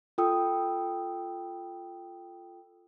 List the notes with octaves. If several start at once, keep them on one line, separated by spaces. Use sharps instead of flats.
F4 A4 G5 D#6 E6